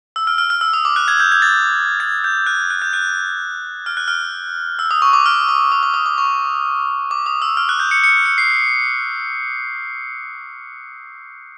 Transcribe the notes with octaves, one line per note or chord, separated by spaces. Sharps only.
E6
F6
F6
F6
E6
D#6
D6
F#6
G#6
G6
G#6
A6
G#6
G6
F#6
F#6
G6
F#6
F6
F#6
F6
E6
D#6
C#6
D6
F6
D6
D#6
D6
D#6
D6
C#6
D6
D#6
E6
F6
F#6
G6
C#7
C#7
C#7
C7